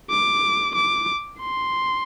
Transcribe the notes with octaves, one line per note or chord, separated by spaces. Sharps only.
D6
D6
C6